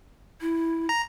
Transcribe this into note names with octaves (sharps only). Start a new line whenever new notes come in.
E4
A#5